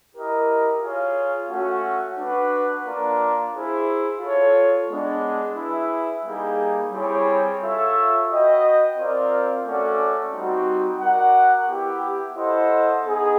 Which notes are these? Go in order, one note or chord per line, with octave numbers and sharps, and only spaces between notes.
E4 G4 A#4 D#5
F4 G#4 C#5 F5
A3 C#4 F#4
D4 F#4 B4
A#3 D4 F4 A#4 D5
E4 G#4 C5
F4 A4 C#5
G#3 B3 D4
E4 G#4 B4 E5
G3 A#3 D#4 G#4
G3 C4 E4 G#4 C#5
F4 A4 C#5 E5
F#4 B4 D#5 G5
C4 F4 A#4 D5
A3 C#4 F#4 A4 D5
G3 C4 D#4 F#4
F#4 A#4 D5 F#5
B3 E4 G4
E4 A4 C5 D#5 F#5
B3 D#4 G#4